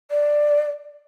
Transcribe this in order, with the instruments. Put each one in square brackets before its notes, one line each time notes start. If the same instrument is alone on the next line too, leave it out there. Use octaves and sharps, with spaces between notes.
[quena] D5